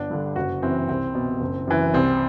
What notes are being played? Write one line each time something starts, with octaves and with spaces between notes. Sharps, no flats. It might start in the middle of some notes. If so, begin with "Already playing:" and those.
Already playing: G1 D4
G2 D3
F#1 F#4
F#2 E3 C4
C2 C4
B2
F#1
F#2 E3
C2 C4